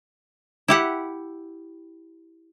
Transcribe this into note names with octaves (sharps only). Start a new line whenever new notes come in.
E4 G4 F#5